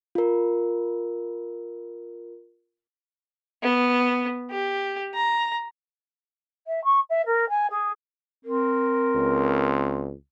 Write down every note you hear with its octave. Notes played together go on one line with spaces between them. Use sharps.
F4 A#4
B3
G4
A#5
E5
C#6
E5
A#4
G#5
G#4
C4 A#4
C#2